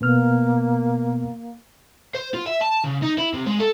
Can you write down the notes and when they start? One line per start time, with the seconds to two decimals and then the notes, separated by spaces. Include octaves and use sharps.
0.01 B2 A#3 B3 F6
2.15 C5
2.34 F4
2.46 E5
2.61 A5
2.84 C#3
3.02 D#4
3.18 E4
3.34 C3
3.46 G#3
3.60 A4